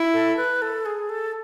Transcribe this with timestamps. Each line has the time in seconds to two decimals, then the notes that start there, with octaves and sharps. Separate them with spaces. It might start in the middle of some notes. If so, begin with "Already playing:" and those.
Already playing: E4
0.13 A4
0.37 B4
0.62 A4
0.86 G#4
1.09 A4